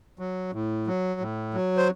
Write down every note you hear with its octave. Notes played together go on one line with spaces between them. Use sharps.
F#3
A2
F#3
A2
F#3
C5